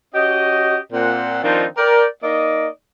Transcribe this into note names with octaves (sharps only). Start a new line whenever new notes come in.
C#4 F#4 G4 D#5
A#2 C4 F#5
D#3 F3 C4 D4 D#4 F4
A#4 D5 G5
A#3 D#4 D5 D#5